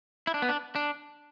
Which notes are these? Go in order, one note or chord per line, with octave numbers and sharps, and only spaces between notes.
E4
D4
B3
D4
D4